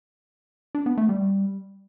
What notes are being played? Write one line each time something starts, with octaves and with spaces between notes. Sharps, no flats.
D4
B3
A3
G3